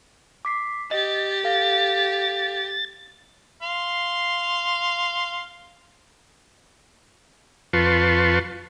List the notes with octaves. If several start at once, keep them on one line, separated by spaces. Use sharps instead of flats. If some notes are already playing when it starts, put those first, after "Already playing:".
D6 B6 C7
G4 D#5 A6
A4 F5 A#6
F5 C6
F2 F4 B4 A5 C6 C#6